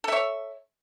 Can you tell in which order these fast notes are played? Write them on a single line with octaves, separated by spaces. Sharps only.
A4 E5 C#5